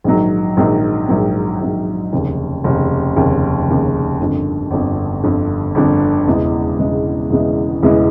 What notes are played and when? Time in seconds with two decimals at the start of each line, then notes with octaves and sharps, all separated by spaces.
0.04 A#1 G#2 D#3 F#3
0.57 A#1 G#2 D#3 F#3
1.09 A#1 G#2 D#3 F#3
1.60 A#1 G#2 D#3 F#3
2.12 F1 D#2 C#3
2.64 F1 D#2 C#3
3.16 F1 D#2 C#3
3.68 F1 D#2 C#3
4.19 G1 F2 D3
4.71 G1 F2 D3
5.24 G1 F2 D3
5.75 G1 F2 D3
6.27 E1 E2 C#3 E3 G#3
6.78 E1 E2 C#3 E3 G#3
7.30 E1 E2 C#3 E3 G#3
7.82 E1 E2 C#3 E3 G#3